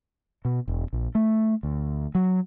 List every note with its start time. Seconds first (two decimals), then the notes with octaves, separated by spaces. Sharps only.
0.45 B2
0.68 E1
0.93 A#1
1.15 A3
1.63 D2
2.15 F#3